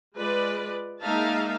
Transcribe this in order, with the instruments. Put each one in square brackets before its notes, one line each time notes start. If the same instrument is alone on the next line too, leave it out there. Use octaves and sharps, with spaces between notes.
[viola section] G#3 F4 B4 D5
G#3 A#3 D#4 E5 F5 A5